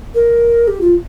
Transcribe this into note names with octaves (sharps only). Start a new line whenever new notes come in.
A#4
G4
F4